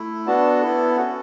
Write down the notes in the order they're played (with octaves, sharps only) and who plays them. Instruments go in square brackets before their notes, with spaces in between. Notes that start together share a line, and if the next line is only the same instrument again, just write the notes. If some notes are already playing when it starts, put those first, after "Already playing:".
Already playing: [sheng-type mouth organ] A3 E4
B3 D4 F#4 A4 A5
B3 E4 A4
C#4 F#4 A4 F#5